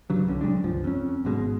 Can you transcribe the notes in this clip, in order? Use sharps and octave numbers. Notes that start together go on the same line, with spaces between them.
G2 C#3 F#3
C2 D3 C#4
C3 F#3 G#3 D4
G1 C#2 F3
F2 C#4
G#1 G#2 B2 G#3